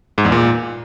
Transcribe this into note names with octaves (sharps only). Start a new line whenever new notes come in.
G#2
E2
A#2